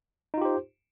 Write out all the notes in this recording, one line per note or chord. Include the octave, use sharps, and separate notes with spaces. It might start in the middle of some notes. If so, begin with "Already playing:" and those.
D#4 F4 G4 C5